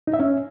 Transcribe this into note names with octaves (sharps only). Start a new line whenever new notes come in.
D#4
E5
C#4